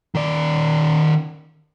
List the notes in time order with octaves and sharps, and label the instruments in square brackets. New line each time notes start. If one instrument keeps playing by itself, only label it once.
[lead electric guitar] D#3 D5